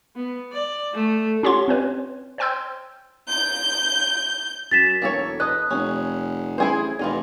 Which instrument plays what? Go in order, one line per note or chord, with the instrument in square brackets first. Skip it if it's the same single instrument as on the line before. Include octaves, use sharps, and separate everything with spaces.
[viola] B3
D5
A3
[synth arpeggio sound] C#4 F4 G4 C#5 F#5 C6
C4 C#4 B4 C#5
C5 C#5 G5 C6 E6 G6
[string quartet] G6
[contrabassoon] F#2 [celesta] A6 B6 E7
[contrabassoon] E1 [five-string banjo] A#3 A4 C#5
[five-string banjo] A4 B4 D#5 [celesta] D#6 F#6
[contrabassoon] F1 [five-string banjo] C#4
[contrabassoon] A1 [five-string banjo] E4 G#4 C5
[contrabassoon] F1 [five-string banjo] E3 F4 D#5